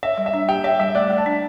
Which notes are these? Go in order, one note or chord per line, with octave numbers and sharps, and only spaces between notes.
C#5 E5
G3
E5
D4
G4 G5
C#5 E5
G3 E5
A3 D5
A3
A5
D4